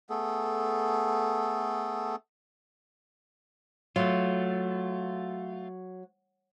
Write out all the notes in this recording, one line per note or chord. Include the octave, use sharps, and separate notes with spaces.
A3 B3 G#4 A4
F#3 A3 F4